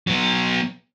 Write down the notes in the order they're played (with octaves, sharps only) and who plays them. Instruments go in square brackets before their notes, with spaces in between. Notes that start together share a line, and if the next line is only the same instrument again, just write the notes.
[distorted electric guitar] F#3 B3